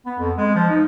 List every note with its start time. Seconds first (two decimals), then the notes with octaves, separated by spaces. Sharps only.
0.06 B3
0.19 F2
0.37 G#3
0.55 F3
0.70 D#4